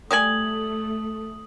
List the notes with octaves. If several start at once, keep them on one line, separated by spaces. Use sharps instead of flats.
G3 A3 D5 G#5 D#6 F#7